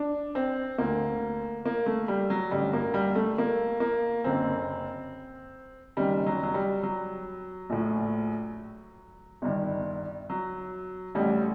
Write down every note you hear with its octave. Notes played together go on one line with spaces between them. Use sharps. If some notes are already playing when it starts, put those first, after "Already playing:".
Already playing: D4
C4
D2 D3 A#3
A#3
A3
G3
F#3
A1 G2 D3 G3
A#3
G3
A3
A#3
A#3
F#1 F#2 D3 C4
F#1 F#2 D#3 G3
F#3
F#3
G3
F#3
A#1 A2
G1 G2 D#3
F#3
A1 A2 G3